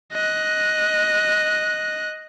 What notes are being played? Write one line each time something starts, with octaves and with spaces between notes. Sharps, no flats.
D#5 F#6